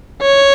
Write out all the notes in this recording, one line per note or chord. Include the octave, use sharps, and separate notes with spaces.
C#5